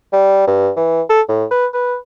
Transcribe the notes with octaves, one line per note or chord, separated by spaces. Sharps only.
G3
G2
E3
A4
A2
B4
B4